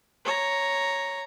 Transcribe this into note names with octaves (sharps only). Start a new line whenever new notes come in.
C#5 A#5